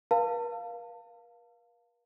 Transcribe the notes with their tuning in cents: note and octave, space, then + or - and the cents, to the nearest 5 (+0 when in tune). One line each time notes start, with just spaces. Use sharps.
A#4 +45 F5 +0 A5 +35